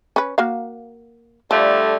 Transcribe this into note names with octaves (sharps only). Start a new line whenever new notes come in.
C#4 B4
A#3 F#4 F5
D3 F3 G3 A3